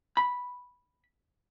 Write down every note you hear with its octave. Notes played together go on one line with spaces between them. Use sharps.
B5